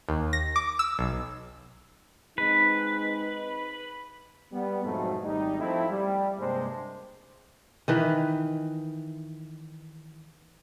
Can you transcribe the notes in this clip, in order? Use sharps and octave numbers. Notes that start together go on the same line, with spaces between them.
D#2
A#6
D6
E6
B1
G#3 C4 D#4 B4
G3 B3
F2 G#2 B2 F#3 A3
G#1 G3 D#4
F3 A3 C4 E4
G3
G2 C3 G#3 A#3 D4 C5
D#3 E3 B4